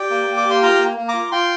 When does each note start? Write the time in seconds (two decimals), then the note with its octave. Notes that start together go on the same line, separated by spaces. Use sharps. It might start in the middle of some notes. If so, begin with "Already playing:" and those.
Already playing: G4 D5 G5
0.11 A#3
0.27 A#3
0.37 D6
0.45 G4
0.50 C6
0.62 F4 F5 A#5
0.79 A#3
0.97 A#3
1.08 A#5 D6
1.14 F4
1.32 F4 G5 C6